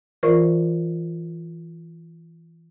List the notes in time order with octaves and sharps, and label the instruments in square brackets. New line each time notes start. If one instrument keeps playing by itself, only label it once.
[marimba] E3 F4 A#4 C5 D5 C#6